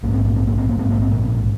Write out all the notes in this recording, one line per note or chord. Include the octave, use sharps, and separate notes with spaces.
A#1 G#2 A#3
C4
A#3
C4
A#3
C4
A#3
A#1 G#2 C4
A#3
C4
A#2 A#3